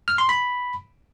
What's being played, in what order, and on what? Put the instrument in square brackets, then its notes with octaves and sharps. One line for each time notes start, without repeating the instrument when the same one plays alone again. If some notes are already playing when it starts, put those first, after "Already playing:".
[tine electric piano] F6
C6
B5